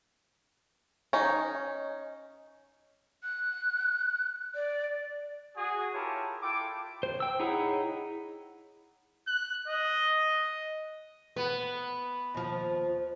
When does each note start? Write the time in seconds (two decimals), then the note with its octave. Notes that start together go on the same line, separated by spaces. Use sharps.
1.13 C#4 D#4
3.23 F#6
4.55 D5
5.56 F#4 G#4
5.94 E4 F4 G4 A#4 C#5 A5
6.42 E4 F4 A4 G5 D6
7.03 C5
7.20 G5 E6
7.40 D#4 E4 G#4 C#5 F#5
9.27 F#6
9.68 D#5
11.36 B3 B4
12.34 D#2 F3